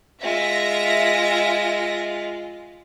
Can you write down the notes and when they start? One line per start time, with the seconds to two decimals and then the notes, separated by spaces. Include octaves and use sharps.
0.23 G#3 F4 E5 A#6